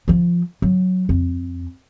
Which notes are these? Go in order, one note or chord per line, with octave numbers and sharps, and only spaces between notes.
F3 F4
F#3
F2